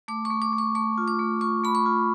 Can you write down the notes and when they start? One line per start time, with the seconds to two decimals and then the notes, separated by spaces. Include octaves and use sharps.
0.08 A3 D6
0.25 C#6
0.30 A3
0.42 D6
0.53 A3
0.58 C#6
0.75 A3 C#6
0.98 F4
1.08 D6
1.19 A3
1.41 F4 C#6
1.64 A3 B5
1.75 C#6
1.86 F4